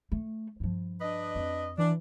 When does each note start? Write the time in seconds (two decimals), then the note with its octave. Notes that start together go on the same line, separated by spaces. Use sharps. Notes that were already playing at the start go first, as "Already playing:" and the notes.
0.12 A3
0.60 G2 F3
1.01 D4 B4 D#5
1.35 F2
1.78 E3 D4